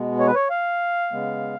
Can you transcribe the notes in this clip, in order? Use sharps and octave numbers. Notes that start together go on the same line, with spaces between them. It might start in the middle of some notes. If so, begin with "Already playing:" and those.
Already playing: B2 G#3 B3
C#5
B4
C#5
F5
C#3 G#3 B3